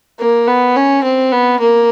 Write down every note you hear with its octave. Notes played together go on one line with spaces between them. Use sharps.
A#3
B3
C#4
C4
B3
A#3